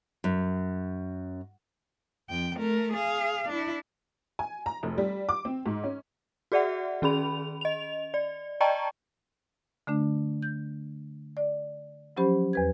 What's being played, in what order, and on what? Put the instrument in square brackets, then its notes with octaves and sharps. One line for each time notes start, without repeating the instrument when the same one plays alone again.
[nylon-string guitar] F#2
[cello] F2 G5
A3 A#4
G#4 F5
D4 E4
[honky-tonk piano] G#5
A#5
F1
G3
D6
C4
G#2
C#4
[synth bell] F#4 G#4 D5 E5 F#5
D#3 C#4 G#4 B5 F7
D#5 F7
D5
D5 D#5 G5 A5 A#5 C#6
[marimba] D3 A3 D4
G6
D5
F3 F#3 C#4 G4 C5 B5
E2 B4 G#6